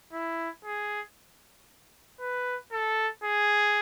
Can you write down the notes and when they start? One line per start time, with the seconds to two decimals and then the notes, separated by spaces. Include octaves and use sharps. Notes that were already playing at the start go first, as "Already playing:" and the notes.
0.13 E4
0.65 G#4
2.20 B4
2.72 A4
3.24 G#4